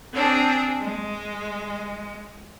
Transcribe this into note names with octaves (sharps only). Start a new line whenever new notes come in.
C4 D4 G#4
G#3